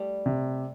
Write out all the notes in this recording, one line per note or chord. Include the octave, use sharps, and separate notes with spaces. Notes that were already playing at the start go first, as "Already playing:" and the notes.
Already playing: G3 A3
C3